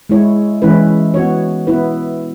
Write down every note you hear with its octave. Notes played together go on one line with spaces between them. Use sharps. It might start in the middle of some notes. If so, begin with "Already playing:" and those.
G#3 E4 C#5
E3 G#3 C#4 E4 B4
B3 F#4 C#5
B3 E4 B4